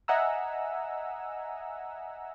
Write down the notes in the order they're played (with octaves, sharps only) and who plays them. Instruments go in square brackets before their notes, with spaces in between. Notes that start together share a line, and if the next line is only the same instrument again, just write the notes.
[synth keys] D#5 E5 F#5 G#5 A#5 E6